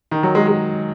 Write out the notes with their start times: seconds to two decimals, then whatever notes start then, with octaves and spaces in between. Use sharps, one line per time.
0.11 D#3
0.23 F#3
0.35 G#3
0.47 G#3